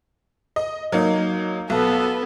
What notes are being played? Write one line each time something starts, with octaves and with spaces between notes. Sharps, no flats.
D#5
F#3 A#3 D#4
B1 B3 A4